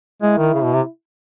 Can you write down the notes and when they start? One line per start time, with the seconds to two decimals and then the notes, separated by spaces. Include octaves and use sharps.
0.22 G#3 E4
0.38 D#3
0.54 C#3
0.64 B2
0.74 C3